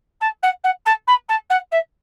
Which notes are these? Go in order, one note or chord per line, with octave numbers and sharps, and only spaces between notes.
A5
F#5
F#5
A5
B5
A5
F#5
E5